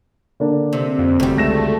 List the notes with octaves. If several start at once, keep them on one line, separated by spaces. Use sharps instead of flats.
D3 A#3 D4
C3
F2
G1 D2 G3
C#2 A3 A#6 E7